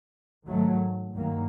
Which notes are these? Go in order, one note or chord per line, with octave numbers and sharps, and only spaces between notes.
G#2 D#3 F#3 A3
G2 D#3 F#3 A#3